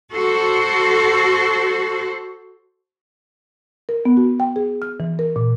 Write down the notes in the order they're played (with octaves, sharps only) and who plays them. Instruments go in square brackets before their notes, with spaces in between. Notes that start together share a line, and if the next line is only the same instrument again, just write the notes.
[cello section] F#4 A4 C5
[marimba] A#4
B3
F#4
G5
G#4
F6
E3
A#4
A#2